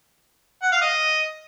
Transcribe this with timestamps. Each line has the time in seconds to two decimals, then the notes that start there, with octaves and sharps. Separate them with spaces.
0.63 F#5
0.72 F5
0.81 D#5